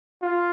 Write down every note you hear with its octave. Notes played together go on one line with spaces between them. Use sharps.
F4